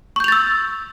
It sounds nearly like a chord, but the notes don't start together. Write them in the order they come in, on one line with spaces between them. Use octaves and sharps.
C#6 G6 F7 A6 E6